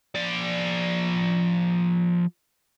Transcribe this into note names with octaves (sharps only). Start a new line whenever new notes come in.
F3 D5